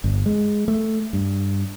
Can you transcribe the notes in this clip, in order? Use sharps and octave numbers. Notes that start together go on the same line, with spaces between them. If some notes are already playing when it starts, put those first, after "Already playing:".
G1
G#3
A3
G2